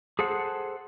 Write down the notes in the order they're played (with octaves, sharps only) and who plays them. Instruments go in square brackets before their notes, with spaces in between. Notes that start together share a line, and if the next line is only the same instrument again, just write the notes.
[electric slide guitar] G#4 A4 C5 F#5